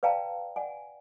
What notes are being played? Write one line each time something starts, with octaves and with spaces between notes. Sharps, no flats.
B4 D5 F5 G5 A5 A#5
D5 F#5 G#5